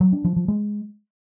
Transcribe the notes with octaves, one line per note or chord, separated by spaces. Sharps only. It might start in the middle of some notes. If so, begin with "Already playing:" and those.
F#3
D4
F3
F3
G#3